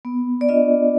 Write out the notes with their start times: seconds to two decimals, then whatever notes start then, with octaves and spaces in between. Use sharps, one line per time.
0.05 B3
0.41 D5
0.49 D4 F4 D#5